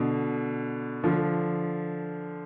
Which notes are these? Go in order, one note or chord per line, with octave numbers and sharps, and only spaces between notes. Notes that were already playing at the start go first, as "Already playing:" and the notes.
Already playing: B2 D3
D3 F3